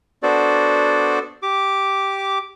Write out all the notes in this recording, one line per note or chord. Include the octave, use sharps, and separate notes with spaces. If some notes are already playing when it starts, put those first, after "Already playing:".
B3 D4 F#4 A4 C5 D5
G4 D6